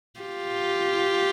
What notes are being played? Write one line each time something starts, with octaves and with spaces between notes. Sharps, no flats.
F4 G4